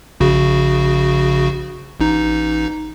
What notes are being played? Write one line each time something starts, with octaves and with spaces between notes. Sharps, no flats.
A#1 C#3 F#4
A1 D#4